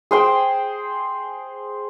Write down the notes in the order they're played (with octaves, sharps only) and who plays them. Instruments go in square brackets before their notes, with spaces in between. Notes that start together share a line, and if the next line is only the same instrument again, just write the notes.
[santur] G#4 C5 G5